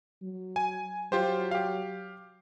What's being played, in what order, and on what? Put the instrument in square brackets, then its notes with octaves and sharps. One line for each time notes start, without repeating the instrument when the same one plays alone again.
[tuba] F#3
[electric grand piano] G#5
[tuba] F#3 [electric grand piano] F4 G4 C5
[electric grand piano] G4 F5